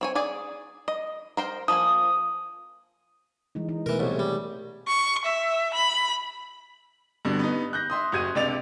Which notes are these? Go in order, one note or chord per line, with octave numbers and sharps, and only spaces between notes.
C4 C#5 G#5
G#4 D5 G#5
D#5
A#4 C5 G5
F3 A#3 G#5 D#6
E3 G#3 D#4
D#4
B2 D#3 E3 A3 A#4
C2 G#2 C#5
G3 G#4
C#6
E5
B5
G2 B2 D3
B3 D#4
F#6 G6 A#6
E5 C6 D#6
F#1 F#4 G#6 D#7
C#2 C3 D4 D5 A6 F7